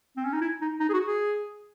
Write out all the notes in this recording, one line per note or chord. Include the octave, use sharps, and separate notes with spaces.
C4
C#4
D#4
E4
D#4
D#4
G#4
F#4
G#4